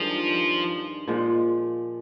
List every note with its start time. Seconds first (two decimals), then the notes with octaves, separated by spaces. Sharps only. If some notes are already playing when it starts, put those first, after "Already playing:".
Already playing: G2 D#3 F3 G#3 D4
1.07 A#2 F3 G#3